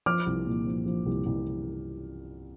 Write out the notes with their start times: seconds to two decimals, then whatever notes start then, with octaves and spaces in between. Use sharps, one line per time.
0.06 F3 D6 F6
0.26 C2
0.46 A#2
0.66 F3
0.86 F3
1.06 C2
1.26 C2